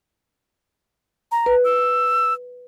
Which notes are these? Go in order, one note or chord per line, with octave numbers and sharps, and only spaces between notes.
A#5
B4
E6